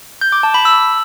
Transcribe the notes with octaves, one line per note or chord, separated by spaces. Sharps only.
G6
D6
A5
B5
E6